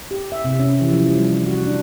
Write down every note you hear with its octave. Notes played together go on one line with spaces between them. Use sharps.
G4
E5
C3
C#4
E3
F3
G3
F#4
D4